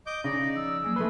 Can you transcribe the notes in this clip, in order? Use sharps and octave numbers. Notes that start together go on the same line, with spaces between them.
D#5 D6 G6
C#3 D#4 D5 A#6
F3 E6
F3 F#3 A#3 G#4
A3 B4 G#5 C6